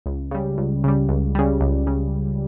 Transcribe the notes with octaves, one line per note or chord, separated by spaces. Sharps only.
C#2
C#3 G3
C#2
C#3 G3
C#2
C#3 G3
C#2
C#3